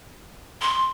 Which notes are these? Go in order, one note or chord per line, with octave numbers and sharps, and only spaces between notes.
C6